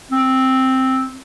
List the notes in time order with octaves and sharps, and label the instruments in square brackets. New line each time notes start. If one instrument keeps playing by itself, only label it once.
[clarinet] C4